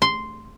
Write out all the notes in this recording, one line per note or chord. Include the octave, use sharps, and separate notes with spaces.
C6